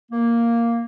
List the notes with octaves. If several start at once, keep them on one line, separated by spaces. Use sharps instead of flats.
A#3